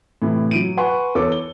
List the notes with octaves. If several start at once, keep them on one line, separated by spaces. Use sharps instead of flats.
A2 C3 E3
F#3 D7 D#7
B4 F#5 G#5 C6 C#6
E2 A4 C#5 D6
G7